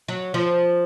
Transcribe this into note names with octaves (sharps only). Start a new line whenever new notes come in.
F#3
F3